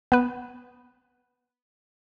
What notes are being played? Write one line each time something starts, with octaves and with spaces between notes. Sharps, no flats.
B3 B4